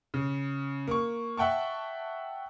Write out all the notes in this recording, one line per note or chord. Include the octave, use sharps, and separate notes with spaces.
C#3
A#3 C#6
E5 F#5 G5 A5 C#6